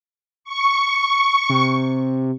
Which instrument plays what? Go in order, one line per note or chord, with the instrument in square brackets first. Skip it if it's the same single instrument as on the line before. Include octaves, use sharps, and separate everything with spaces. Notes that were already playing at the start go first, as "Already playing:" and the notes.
[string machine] C#6
[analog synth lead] C3